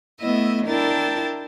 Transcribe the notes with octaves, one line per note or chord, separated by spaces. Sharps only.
A3 B3 E4 D#5 E5
D4 E4 A#4 G5 A5 A6